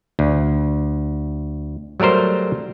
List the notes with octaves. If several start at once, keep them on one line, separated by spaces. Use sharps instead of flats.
D2
F#3 G3 A3 A#4 C5